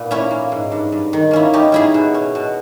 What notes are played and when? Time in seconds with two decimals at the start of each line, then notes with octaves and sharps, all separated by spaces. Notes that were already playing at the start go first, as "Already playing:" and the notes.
Already playing: A#2 B3
0.11 A#3 C#4 E4
0.31 A#3
0.52 G#2
0.71 G2
0.92 G2
1.13 D#3
1.31 A#3 C#4 E4
1.53 C#4 D#4 G4
1.72 C#4 E4 G#4
1.94 B2
2.14 C#4
2.35 B2